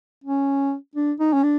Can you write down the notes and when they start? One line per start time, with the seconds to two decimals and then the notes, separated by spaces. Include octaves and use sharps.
0.24 C#4
0.96 D4
1.20 D#4
1.33 C#4
1.43 D4